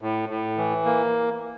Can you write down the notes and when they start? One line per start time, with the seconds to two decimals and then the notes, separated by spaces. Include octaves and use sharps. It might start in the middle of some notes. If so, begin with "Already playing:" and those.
0.02 A2
0.29 A2
0.58 E3
0.85 A#3